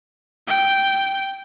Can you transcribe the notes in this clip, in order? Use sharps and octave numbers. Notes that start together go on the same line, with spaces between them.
G5